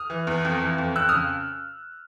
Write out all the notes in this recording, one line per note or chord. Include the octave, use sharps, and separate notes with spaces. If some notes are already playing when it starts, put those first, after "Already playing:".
Already playing: D#6 F6
E3
E2
F2
E3
F2
F2 E6 F#6
C#3 D#6 F6